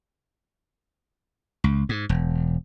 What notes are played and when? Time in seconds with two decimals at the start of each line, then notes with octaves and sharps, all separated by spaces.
1.64 C#2
1.89 G#2
2.09 E1